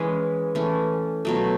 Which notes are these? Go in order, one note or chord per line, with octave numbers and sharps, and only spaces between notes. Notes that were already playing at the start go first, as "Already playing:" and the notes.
Already playing: E3 G#3 C#4 G#4 B4
E3 A3 C#4
B2 F#3 A3